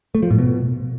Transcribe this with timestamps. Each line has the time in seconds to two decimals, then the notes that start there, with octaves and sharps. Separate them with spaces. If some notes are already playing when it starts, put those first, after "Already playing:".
0.15 A3
0.23 F3
0.30 A2
0.38 B2